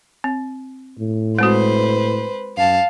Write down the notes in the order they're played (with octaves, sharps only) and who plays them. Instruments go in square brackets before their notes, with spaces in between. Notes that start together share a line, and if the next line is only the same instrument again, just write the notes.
[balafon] C4
[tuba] A2
[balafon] G#3 C4 F#4 [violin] B4 C5
[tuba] F#2 [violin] F5 A5